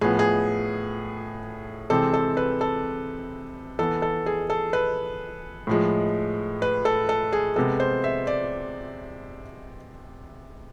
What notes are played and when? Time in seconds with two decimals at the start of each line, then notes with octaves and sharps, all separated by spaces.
0.01 A2 F3 B3 G#4
0.19 G#4
1.90 C3 E3 G#3 C4 A4
2.14 A4
2.37 B4
2.61 A4
3.79 E3 B3 A4
4.02 A4
4.26 G#4
4.50 A4
4.73 B4
5.67 A2 F3 G#3
6.62 B4
6.85 A4
7.09 A4
7.33 G#4
7.56 C3 G#3 B3 A4
7.80 C5
8.04 E5
8.27 D5